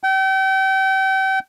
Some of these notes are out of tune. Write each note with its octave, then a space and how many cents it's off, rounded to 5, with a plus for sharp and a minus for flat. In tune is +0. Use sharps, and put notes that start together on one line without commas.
G5 -35